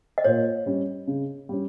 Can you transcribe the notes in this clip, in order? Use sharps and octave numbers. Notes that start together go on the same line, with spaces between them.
D#5
A#2 C#5
G3 C#4
C#3
G3 C#4